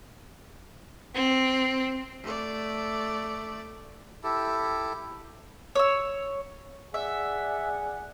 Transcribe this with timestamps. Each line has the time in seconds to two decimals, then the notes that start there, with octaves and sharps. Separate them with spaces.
1.14 C4
2.24 A3 D5
4.23 E4 G4 A4
5.75 C#5 E6
6.94 G#4 D5 E5 F#5